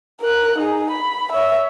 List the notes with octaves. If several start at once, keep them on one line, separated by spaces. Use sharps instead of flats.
A#4 F#6
D#4 G#4
B5
C#5 E5